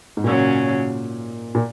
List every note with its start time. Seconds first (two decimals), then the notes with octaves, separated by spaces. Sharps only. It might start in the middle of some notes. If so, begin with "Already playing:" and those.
0.17 G#2
0.24 A#2 C#3 F#3 C#4
1.55 A#2